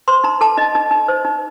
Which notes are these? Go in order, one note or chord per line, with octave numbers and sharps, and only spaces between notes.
C5 C6
D#4 A#5
A4 A5
D#4 D#5
D#4
D#4
C5
D#4